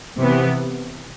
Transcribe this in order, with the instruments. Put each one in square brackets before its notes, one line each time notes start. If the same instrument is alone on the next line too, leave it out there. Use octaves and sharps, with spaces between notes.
[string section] C3 E3 B3